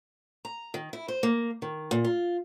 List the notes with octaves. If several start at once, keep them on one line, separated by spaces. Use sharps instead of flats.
A#5
D#3
E4
C5
A#3
D#3
A#2
F4